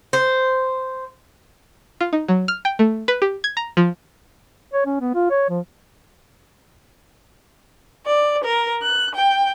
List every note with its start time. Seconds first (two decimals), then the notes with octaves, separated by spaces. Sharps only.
0.13 C5
2.01 F4
2.13 D#4
2.28 F#3
2.48 F6
2.65 G5
2.79 A3
3.08 B4
3.22 G4
3.44 G#6
3.57 A#5
3.77 F3
4.74 C#5
4.86 C#4
5.01 B3
5.15 F4
5.30 C#5
5.50 F3
8.06 D5
8.43 A#4
8.82 F#6
9.15 G5